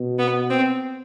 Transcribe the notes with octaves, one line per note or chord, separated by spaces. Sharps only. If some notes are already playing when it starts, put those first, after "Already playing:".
Already playing: B2
B3
C4